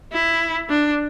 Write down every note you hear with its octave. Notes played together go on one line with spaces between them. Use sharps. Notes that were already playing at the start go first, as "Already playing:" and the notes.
E4
D4